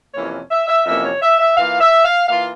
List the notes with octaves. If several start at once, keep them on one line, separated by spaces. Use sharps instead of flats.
F2 C3 E3 A#3 C#4 C#5
E5
E5
F2 C3 E3 A#3 C#4 E5
C#5
E5
E5
E3 A#3 F4 F5
E5
F5
E3 A#3 F4 F5